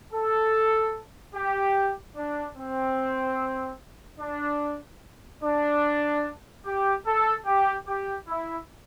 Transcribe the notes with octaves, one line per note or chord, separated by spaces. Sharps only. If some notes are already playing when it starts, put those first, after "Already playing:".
A4
G4
D4
C4
D4
D4
G4
A4
G4
G4
E4